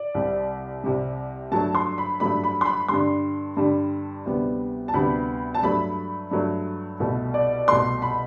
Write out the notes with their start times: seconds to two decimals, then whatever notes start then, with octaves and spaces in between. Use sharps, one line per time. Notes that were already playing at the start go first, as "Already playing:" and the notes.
Already playing: D5
0.15 C2 C3 G3
0.84 C2 C3 G3
1.52 G2 F#3 A3 A5
1.75 C6
1.98 B5
2.20 G2 F#3 A3 B5
2.44 B5
2.61 C6
2.65 B5
2.88 G2 D3 G3 C6
3.57 G2 D3 G3
4.26 D2 C3 G3 B3
4.88 A5
4.94 D2 C3 G3 B3 B5
5.54 A5
5.63 G2 F#3 A3 B5
6.31 G2 F#3 A3
7.00 C2 B2 A3
7.34 D5
7.68 C2 B2 A3 C6
8.02 B5